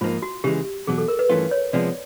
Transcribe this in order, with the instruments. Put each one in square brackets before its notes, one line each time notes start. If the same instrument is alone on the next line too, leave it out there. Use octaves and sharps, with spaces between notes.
[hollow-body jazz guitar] G#2 F3 A#3 D#4 [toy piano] F4
[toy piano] F#4
[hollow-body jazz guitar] C#3 E3 G#3 [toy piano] G4
[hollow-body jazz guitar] E2 B2 F#3 [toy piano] G#4
[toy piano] A4
A#4
B4
[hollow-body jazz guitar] G2 E3 A3 C#4 F4
[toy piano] C#5
[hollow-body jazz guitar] C3 F3 G#3 B3 [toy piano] D5